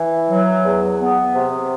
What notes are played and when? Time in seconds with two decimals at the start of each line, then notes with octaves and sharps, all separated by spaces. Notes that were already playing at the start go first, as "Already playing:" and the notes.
Already playing: E3
0.29 F#3
0.64 E2
1.00 B3
1.35 C3